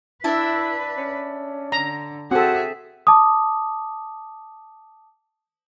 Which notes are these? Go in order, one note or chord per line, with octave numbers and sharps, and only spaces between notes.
D4 E4 B4 E5
C#4
D3 A#5
C4 F#4 G#4 A4 E5
A5 D6 D#6